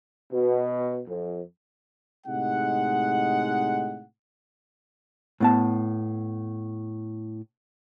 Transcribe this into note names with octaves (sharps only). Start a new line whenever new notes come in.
B2
F2
A2 C3 G#3 D#4 F#5
A2 B3 A5